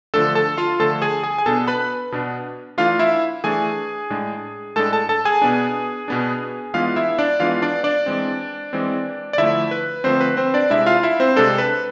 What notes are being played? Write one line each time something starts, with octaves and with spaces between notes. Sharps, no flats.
D3 F3 A3 D4 A4 A5
A4 A5
F4 F5
D3 F3 A3 D4 A4 A5
G#4 G#5
G#4 G#5
G#5
B2 B3 D4 A4 A5
B4 B5
B2 B3 D4
E3 A3 D4 F4 F5
E4 E5
E3 A3 D4 G#4 G#5
A2 G#3 D4
A2 G#3 D4 A4 A5
A4 A5
A4 A5
G#4 G#5
B2 B3 D4
B2 B3 D4
E3 G#3 B3 D4 F4 F5
E4 E5
D4 D5
E3 G#3 B3 D4 F4 F5
D4 D5
D4 D5
E3 G#3 C4
E3 G#3 C4
D5
D3 F3 A3 E4 E5
B4
D3 F3 A3 C4 C5
B4
C4 C5
D4 D5
C3 G#3 D4 E4 E5
F4 F5
E4 E5
C4 C5
C3 G#3 D4 A4
B4